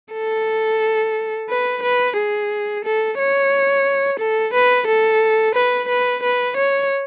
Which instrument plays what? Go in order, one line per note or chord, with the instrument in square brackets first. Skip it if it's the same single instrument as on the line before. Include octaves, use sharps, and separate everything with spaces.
[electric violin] A4
B4
B4
G#4
A4
C#5
A4
B4
A4
B4
B4
B4
C#5